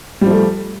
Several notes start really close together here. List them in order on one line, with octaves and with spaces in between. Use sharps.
G3 F3 A3